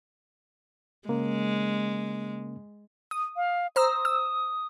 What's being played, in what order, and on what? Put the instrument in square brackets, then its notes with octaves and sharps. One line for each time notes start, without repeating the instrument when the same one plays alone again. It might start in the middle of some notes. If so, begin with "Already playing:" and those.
[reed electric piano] C#3 A#3 C#4 [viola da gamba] G#3
[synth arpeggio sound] D#6
[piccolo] F5
[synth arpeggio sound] C5 A#5 E6 [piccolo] D#6
[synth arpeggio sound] E6